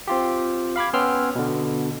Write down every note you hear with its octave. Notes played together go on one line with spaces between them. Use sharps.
C4 F4 G4
F5 B5 D6 G#6
B3 C#4 G5 C6 E6 F6
B2 D3